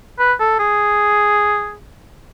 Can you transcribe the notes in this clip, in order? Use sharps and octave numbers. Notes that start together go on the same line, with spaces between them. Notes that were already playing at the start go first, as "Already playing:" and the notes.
B4
A4
G#4